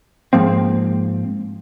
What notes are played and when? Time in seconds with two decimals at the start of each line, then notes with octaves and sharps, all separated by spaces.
0.33 G#2 F3 A#3 C4